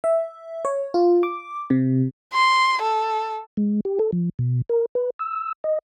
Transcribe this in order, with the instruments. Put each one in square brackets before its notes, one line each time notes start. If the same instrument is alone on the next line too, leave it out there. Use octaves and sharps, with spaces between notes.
[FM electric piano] E5
C#5
F4
D6
C3
[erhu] C6
A4
[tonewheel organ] G#3
G4
A4
F3
B2
A#4
B4
E6
D#5